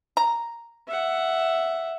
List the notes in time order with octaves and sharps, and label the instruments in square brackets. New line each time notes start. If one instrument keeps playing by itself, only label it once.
[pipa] A#5
[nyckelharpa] E5 F#5